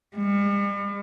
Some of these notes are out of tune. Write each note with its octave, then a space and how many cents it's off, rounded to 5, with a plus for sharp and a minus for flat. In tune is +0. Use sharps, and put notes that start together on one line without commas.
G3 +45